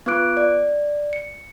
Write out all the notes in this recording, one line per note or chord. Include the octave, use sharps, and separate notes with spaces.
B3 F4 B4 D6 F#6 D7
D5
C#7